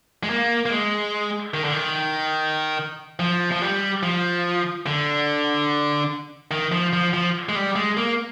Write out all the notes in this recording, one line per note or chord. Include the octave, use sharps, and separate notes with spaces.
G#3
A#3
A#3
G#3
D#3
D3
D#3
F3
F3
G3
F3
D3
D#3
F3
F3
F3
G#3
G3
G#3
A#3